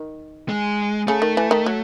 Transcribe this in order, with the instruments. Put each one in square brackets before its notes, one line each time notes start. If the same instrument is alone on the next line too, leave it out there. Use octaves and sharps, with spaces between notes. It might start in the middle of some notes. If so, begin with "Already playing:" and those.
Already playing: [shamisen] D#3
[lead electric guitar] G#3
[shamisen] C#3 [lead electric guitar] A3
[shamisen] D#3
E3
D#3
F#3